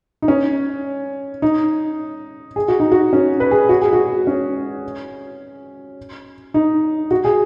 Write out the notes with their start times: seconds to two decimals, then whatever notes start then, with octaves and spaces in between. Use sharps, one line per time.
0.22 D#4
0.28 C#4
1.42 D#4
2.56 G#4
2.68 F#4
2.80 D#4
2.92 F#4
3.13 C#4
3.40 B4
3.51 G#4
3.69 F#4
3.82 G#4
3.93 F#4
4.27 C#4
6.54 D#4
7.11 F#4
7.25 G#4